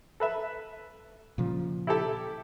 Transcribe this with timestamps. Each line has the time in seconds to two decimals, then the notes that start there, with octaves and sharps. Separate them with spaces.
0.20 A4 B4 E5
1.38 A#2 C#3 F3
1.87 E4 G4 A4